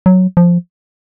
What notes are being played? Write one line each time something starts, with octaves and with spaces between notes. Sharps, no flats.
F#3
F3